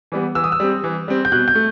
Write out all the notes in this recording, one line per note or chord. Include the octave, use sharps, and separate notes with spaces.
E3 G3 B3
E3 E6
D#6
E6
G3 C4
E3
G3 C4
G6
B2 F#6
G6
A3